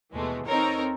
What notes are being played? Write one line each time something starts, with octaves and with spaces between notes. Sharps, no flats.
D#2 B2 E3 G#3 A3
C4 D#4 A4 A#4 C#5